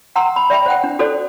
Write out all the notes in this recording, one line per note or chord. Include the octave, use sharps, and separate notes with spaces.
F#5 G5 A#5 C6 E6
B5
D5 E5 G5 B5
C5 F#5 G5
D4
F#4 A4 C5 D5